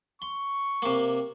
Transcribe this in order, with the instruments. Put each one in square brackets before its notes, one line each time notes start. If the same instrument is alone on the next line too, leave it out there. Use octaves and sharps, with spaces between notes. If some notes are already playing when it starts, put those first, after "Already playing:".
[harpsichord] C6 [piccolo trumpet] C#6
[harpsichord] C3 A#3